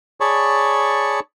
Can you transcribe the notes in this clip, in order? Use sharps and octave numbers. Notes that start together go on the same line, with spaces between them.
G#4 C#5 D5 A5 B5 C#6